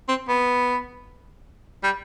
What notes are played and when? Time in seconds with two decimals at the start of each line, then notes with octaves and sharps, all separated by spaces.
0.08 C4
0.28 B3
1.84 G3